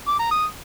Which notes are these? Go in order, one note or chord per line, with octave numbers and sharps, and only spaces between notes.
D6
A#5
D#6